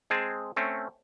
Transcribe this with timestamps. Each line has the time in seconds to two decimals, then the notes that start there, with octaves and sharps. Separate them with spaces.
0.10 G#3 C4 G#4 A5
0.56 A3 C4 C#4